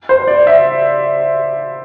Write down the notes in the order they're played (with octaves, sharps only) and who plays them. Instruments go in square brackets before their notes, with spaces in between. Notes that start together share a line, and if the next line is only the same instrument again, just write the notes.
[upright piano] C5
D5
E5